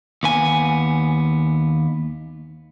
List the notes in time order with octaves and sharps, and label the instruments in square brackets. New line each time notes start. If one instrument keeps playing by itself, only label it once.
[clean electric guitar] D#2 B3 G#5